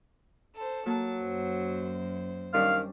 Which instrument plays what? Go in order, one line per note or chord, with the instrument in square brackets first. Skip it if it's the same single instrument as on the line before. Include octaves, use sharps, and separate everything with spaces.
[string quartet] A4 C5
[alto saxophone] F#3 [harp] A#3 [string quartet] A5
[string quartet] F#2 C5
[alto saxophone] D#3 [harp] G3 C#4 D4 [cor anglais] F5